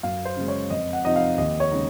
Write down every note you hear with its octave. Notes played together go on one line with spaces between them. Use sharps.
F#2 F5
C5
C#3 G#3
C#5
F2 D#5
F#5
C3 F3 C4 D#4 D#5
F5
D#2 D#5
C#5
C#3 G#3 D#4